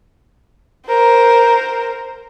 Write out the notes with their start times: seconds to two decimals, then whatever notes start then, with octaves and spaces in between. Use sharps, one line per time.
0.87 A#4 C5